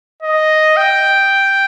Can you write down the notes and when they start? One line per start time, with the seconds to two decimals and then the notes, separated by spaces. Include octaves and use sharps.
0.23 D#5
0.77 G5